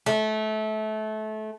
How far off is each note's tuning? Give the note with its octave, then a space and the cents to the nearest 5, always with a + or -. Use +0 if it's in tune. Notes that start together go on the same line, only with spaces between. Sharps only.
A3 -25